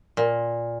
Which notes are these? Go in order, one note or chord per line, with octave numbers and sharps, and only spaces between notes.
A#2